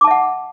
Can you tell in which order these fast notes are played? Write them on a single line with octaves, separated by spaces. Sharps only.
D6 A5 E5 F#5